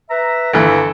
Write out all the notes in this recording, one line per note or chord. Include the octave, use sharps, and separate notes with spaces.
B4 E5 A#5
G1 E3 A4